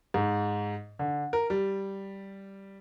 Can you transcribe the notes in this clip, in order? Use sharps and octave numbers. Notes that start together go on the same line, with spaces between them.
G#2
D3
A#4
G3